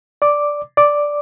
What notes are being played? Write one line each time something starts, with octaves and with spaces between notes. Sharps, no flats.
D5 D6
D5 D6